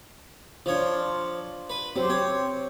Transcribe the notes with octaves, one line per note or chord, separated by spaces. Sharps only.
F3 D4 F4 C#5
B4
F#3 C4 G4 C5
C4 C#5